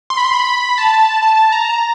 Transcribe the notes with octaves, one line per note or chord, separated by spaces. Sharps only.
C6
B5
C6
B5
A5
A5
A#5